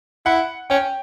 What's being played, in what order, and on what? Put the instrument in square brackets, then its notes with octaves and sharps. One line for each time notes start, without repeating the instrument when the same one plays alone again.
[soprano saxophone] E4 [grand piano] F#5
[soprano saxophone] C#4 [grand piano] G5